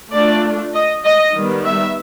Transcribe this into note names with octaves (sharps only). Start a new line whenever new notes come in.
A3 D4 F4 D5
D#5
D#5
D#3 G3 B3
E5